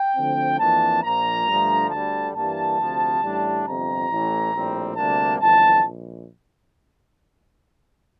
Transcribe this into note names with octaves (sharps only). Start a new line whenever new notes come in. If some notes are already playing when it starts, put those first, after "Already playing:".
Already playing: G5
D2 D3 F3 C4
F2 E3 A#3 D4 A5
A#1 A#2 F3 A#3 A#5
G2 D3 F3 A3
D2 D3 G3 A5
G2 E3 G3 A#3 A5
D2 C3 F3
A1 A2 G3 D4
G1 F2 C3 A#5
A1 A2 E3
A#1 A2 G3 C4
D2 C3 G3 A#3 D4 A5
G1 F2 E3 A5
A#1